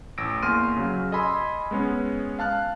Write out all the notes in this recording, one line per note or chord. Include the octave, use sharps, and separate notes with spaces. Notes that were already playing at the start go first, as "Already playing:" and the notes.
A1 E6 A#6 D7
E2 A#3 C6 F6 D#7
C#3 F#3
A4 D#5 G#5 B5 C6 E6
G#3 B3 C#4
F5 A5 F6 F#6